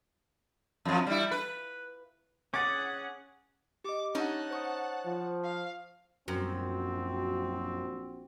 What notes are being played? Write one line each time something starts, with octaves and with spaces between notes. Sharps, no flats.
F2 F3
G3 E4
B4
C#4 G#4 F#5 D6 A6
G4 D#5 D6
C#4 D#4 F#5 A5
C5 C#6 D#6
F3
F5
A#1 F#2 C4 F#4